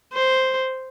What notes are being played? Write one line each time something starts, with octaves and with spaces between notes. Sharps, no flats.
C5